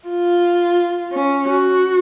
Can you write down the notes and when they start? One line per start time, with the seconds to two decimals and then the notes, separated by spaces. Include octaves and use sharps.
0.09 F4
1.13 C#4
1.48 F#4